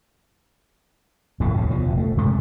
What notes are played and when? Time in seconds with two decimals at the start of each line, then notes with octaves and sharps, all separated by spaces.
1.40 D1 A2 F3 A3
1.55 D2 C#3
1.70 B2 F3
1.86 F1
1.98 A3
2.17 C3 G#3 A3